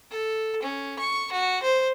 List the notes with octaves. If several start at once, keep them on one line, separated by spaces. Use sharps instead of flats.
A4
C#4
C#6
F#4
C5